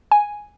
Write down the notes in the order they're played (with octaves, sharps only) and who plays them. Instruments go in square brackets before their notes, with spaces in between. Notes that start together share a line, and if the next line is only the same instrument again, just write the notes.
[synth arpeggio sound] G#5